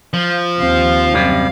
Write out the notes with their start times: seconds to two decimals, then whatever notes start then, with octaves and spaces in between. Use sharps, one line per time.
0.14 F3
0.60 D#2 C4 F5
1.14 F#2 C3 G3